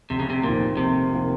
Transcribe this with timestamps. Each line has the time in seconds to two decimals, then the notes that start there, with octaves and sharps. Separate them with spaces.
0.10 F1 C3
0.20 C#3
0.30 C3
0.43 F2 A#2 D#3 A#3
0.77 F1 C3
1.11 F2 D#3 A#3